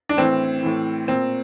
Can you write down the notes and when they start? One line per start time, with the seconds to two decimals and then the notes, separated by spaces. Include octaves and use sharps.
0.09 D4
0.17 A2 E3 C4
0.63 A2 E3
1.08 A#2 C4